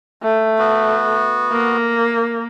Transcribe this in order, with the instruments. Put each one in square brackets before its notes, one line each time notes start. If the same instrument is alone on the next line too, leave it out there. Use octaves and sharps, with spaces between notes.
[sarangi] A3
[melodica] B3 F#4
[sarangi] A#3